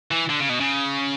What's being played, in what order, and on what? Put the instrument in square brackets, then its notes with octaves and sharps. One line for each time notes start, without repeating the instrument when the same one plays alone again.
[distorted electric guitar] E3
D3
C#3
B2
C#3